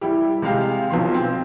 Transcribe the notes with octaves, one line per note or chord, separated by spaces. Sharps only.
G3 E4 G4
C3 G#3 F5 G5
B1 B2 F3 C6
C4